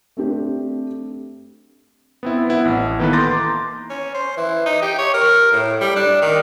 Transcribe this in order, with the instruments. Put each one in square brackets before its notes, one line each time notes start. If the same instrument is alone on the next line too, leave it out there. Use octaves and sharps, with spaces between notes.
[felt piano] A3 C4 D4 G4
[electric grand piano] B3 C4 E4
B3 E4 F#5
A1
D#3 E3 A#3 B3 A4 B4
A#5 C6 D6 G6 A6 A#6
[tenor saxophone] C#4
C5
E3
D#4
G4
C#5
A#4
A2
G3
D4
D#3